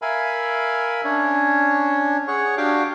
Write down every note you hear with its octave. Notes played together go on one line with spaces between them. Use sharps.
A#4 E5 F5 G#5 B5
C#4 D4 C#5
G#4 C#5 F#5 C#6
D4 F#4 G4 F5 G5 D6